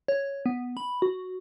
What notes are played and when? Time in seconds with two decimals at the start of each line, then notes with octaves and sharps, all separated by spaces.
0.08 C#5
0.46 B3
0.77 B5
1.02 F#4